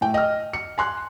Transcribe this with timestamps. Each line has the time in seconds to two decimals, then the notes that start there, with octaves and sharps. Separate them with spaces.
0.01 A2 G5
0.14 D#5 F6
0.53 C#7
0.78 G#5 C6 F#6